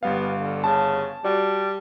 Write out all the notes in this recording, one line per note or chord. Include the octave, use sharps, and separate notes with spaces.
G1 G3 B3 F5
D3
C#3 A5
G3 F#4 D5